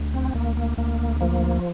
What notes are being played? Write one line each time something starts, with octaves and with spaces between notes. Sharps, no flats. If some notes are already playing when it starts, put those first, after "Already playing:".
Already playing: D2
C4
D2 A#3
A#3
D2 A#3
F3 A#3